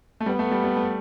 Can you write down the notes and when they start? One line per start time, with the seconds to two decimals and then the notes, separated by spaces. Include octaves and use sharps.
0.20 A3
0.26 G3 B3
0.39 A3
0.52 G3
0.64 G3
0.76 A3